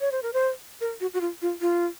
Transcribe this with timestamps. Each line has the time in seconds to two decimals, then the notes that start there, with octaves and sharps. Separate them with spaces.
0.01 C#5
0.12 C5
0.23 A#4
0.33 C5
0.81 A#4
1.01 F#4
1.14 F#4
1.21 F4
1.42 F4
1.61 F4